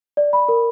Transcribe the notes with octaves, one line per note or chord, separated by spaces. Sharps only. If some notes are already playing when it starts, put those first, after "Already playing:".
D5
B5
A#4